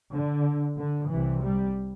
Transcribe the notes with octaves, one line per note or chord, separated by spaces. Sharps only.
D3
D3
C2 C3 E3
G3